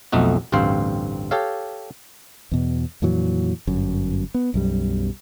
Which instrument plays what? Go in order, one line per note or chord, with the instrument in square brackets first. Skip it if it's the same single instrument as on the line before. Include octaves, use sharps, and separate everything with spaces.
[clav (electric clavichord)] B1 F2 A3 D#4 F#4
A1 D2 G2 C4 C5 F5
G4 A4 C#5 F5
[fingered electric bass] E2 B2
F2 A#2 E3 F#3
G1 F#2
B3
B1 F#2 G3